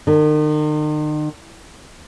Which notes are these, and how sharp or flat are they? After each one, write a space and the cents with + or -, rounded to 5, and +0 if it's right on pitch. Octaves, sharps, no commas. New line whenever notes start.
D#3 -40